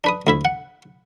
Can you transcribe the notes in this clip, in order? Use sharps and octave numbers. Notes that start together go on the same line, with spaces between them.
D4 B4 D#6
D2 E4 E5
F#5